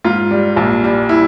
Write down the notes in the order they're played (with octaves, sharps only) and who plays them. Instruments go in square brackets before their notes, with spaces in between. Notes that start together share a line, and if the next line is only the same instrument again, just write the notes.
[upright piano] G#2 F4
G3
A#1
G3
E4